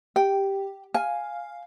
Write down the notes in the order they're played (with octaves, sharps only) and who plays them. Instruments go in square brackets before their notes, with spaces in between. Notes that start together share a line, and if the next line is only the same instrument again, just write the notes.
[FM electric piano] G4 [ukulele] G5
[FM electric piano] F5 [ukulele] G#5